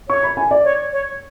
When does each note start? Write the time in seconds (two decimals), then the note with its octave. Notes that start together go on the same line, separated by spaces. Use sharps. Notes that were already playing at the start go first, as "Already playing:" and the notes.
0.08 C#5 C#6
0.23 B5
0.37 G#5
0.51 D5
0.64 C#5
0.92 C#5